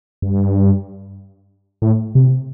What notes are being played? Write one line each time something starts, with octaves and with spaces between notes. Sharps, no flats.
G2
A2
C3